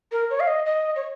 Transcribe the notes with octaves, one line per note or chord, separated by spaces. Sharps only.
A#4
C#5
F5
D#5
D#5
C#5